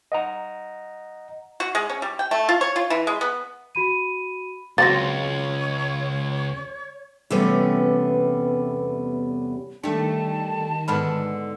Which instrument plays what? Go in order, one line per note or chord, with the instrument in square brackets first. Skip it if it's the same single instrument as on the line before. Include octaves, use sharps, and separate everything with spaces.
[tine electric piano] D#5 F#5 A#5
[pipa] F#4
G#3
C#4
G3
G5
A3
F4
C#5
F4
E3
G#3
B3
[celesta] F#4 B5 D#7
[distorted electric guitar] C#2 [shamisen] F#3 C4 [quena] C#5 [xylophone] A6 A#6
[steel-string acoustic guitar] E2 C3 G3 A3 B3 C#4
[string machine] D#3 [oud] G3 A3 [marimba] D4 [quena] A5
[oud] G#2 D3 B3 [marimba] B5 F6